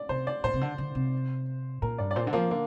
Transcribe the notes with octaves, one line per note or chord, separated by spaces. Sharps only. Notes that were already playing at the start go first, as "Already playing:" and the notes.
Already playing: D5
C3 C5
D5
A#2 C5
C3
D3
D3
C3
A#2 A#4
G2 D5
D5
A#2 C5
D3
F3 A#3
D3 A#3